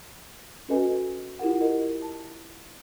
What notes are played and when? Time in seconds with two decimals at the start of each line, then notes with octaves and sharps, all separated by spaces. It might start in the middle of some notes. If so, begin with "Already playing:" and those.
0.68 C#4 F#4 A4 B4 D#5 G#5
1.39 E4 F4 G4 A#4 F#5
1.61 A#4 D#5
2.02 A5